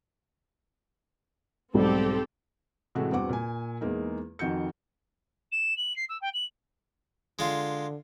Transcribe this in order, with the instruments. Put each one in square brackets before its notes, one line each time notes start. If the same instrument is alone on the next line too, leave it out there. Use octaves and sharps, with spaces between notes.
[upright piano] B1 G#2 G3 [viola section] C4 G4 A4
[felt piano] A2 C3 E3 G#3 A3 F#4
E2 G2 C4 F#4 F#5 D6
A#2 G#5
E2 G#3 A#3 D#4
F2 D#3 F#4 G6 C#7
[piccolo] E7
F#7
C7
E6
G5
F#7
[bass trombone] D3 [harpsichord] G#3 F4